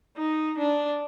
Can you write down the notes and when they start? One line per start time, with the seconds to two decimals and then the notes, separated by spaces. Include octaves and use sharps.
0.17 D#4
0.59 D4